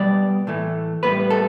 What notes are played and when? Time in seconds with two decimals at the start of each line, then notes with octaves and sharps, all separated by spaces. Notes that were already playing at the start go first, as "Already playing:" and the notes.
Already playing: B2 G3 B3 D5
0.47 A2 E3 A3
1.03 A2 G3 B3 B4
1.30 A4